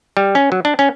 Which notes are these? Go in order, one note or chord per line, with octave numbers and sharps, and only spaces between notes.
G3
C#4
F#3
D4
C#4